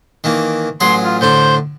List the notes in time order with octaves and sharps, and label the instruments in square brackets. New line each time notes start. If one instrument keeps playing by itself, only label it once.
[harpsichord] D#3 E3 A#3
[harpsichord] A1 F#3 G#4 [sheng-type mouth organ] C6
[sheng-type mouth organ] F4
[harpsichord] A2 D3 D4 [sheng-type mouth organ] C5 G6